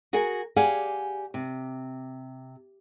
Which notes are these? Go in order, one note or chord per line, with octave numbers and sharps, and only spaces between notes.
F#4 G#4 A#4 F#5 G#5
G4 G#4 D5 F5 F#5 G#5
C3